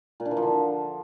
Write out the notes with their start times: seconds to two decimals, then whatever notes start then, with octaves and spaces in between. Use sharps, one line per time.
0.20 A#2
0.25 D4
0.31 E3
0.37 F3
0.42 D3